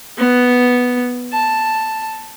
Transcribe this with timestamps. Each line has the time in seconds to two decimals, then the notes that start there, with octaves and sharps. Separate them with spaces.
0.18 B3
1.32 A5